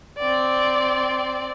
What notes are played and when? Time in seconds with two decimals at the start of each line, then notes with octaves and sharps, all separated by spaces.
0.18 C4 D5